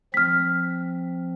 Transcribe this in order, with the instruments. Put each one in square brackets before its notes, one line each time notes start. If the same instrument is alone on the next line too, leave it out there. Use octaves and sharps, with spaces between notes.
[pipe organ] F3 C4 [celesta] F6 B6